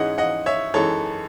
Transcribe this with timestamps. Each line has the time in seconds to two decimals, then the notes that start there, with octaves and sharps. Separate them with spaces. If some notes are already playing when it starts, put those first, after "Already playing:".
Already playing: G#2 E3 G#3 C#4 D#5 F#5
0.18 D#5 F#5
0.46 C#5 E5
0.74 F#2 E3 G#3 D#4 A4 C#5